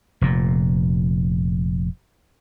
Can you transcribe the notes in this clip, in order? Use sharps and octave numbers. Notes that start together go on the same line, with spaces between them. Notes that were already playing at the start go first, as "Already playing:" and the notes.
F1 A#2